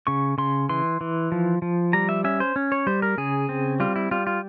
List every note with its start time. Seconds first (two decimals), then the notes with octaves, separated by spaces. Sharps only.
0.07 C#3 C#6
0.38 C#3 C6
0.69 E3 C6
1.01 E3
1.32 F3
1.62 F3
1.93 G3 A#5
2.09 E5
2.24 C#4 E5
2.40 C5
2.56 C#4
2.72 C#5
2.87 G3 C5
3.02 A#4
3.18 C#3 G#4
3.49 C4
3.80 G3 F4
3.96 E4
4.11 G3 F4
4.27 F4